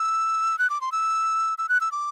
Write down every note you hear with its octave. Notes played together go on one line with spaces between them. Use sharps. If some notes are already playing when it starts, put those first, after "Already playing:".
Already playing: E6
F#6
D6
C6
E6
E6
F#6
E6
D6